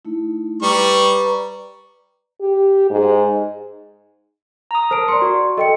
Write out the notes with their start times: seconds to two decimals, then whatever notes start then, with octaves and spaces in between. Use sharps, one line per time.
0.05 A3 D#4 E4
0.62 G3 B4 D5 A#5 C#6
2.41 G4
2.90 G#2
4.71 A#5 D#6
4.91 A#4 C5 A5 D7
5.08 D5 C6 C#7
5.22 F#4
5.58 A4 D#5 G5 C#7